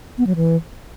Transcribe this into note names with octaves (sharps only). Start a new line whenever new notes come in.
B3
F#3
E3